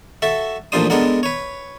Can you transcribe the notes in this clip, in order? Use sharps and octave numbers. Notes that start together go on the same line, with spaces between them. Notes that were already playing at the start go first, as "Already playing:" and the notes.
F#4 A4 E5
A1 A#2 F3 D4 C5 D#6
G#3 B3 D4 A4 A#4 F#5
B4 C#5